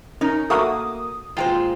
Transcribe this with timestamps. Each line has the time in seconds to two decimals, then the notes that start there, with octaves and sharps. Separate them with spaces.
0.21 C#4 D#4 A#4
0.50 A3 A#3 F#4 A#4 D#6
1.37 A#2 G#3 F4 C5 G5